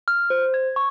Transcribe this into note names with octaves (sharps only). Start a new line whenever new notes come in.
F6
C5
G#6
C#6